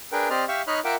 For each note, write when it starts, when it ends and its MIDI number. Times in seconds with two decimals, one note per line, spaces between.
0.12 0.28 62
0.12 0.28 68
0.12 0.28 70
0.12 0.28 71
0.12 0.28 79
0.30 0.44 60
0.30 0.44 67
0.30 0.44 72
0.30 0.44 74
0.30 0.44 75
0.30 0.44 89
0.48 0.61 67
0.48 0.61 76
0.48 0.61 77
0.48 0.61 85
0.67 0.80 63
0.67 0.80 73
0.67 0.80 75
0.67 0.80 83
0.67 0.80 89
0.67 0.80 90
0.85 0.95 65
0.85 0.95 70
0.85 0.95 76
0.85 0.95 78
0.85 0.95 79
0.85 0.95 86